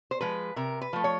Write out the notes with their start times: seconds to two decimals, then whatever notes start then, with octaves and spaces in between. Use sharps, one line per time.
0.11 C5
0.21 F3 G#3 B4
0.56 C3 A#4
0.81 B4
0.93 F3 A3
1.04 C#5